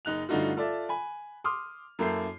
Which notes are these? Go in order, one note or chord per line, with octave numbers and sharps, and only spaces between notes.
F#1 D#4 F#6 F7
G2 D3 A3 D#4 F4 F#4
F4 A4 D5 E5
G#5 B5
C6 D6 D#6 F6
F#2 A#3 E4 A4 G6 C7